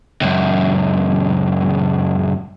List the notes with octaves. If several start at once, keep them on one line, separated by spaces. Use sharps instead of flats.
C#2 F#2